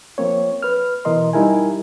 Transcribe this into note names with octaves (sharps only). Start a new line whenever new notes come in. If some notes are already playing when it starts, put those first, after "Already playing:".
F3 A#3 C4 C#5
B4 F6
B2 E3 A#4 D#5 C6
G3 D#4 E4 A#4 G#5